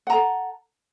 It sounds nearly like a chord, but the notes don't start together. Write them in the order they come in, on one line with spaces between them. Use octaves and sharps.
F#5 A#5 A4